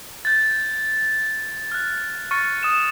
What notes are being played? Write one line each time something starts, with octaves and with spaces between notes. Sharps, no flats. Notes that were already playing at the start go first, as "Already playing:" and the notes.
G6 A6
F6 F#6
C#6 F6 A6 C#7
D#6 E7